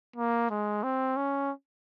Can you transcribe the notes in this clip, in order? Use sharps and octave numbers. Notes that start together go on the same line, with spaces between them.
A#3
G#3
C4
C#4